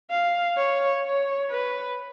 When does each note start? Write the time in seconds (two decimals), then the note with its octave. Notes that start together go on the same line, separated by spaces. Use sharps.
0.11 F5
0.57 C#5
1.05 C#5
1.51 B4